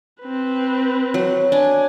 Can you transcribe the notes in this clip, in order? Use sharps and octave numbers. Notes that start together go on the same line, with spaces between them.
C4 B4
F#3
D4 G#5